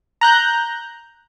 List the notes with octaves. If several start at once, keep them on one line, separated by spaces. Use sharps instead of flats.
A#5 F#6 G6